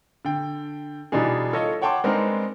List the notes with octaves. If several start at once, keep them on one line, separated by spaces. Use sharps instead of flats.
D3 G5
B2 E3 G3 D4 D#4 G#4
F4 A4 C#5 D#5
C#5 F#5 G5 A5 C6 D6
G#3 B3 C4 D4 D#4 A#4